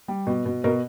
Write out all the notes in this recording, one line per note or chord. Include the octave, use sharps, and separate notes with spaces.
G3
B2
B2
B2 A#4